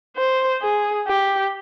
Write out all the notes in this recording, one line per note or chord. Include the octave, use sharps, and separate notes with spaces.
C5
G#4
G4